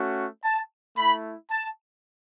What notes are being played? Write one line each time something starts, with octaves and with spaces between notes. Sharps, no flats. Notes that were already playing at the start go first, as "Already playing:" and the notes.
Already playing: A3 C#4 F#4
A5
A3 E4 B5
A5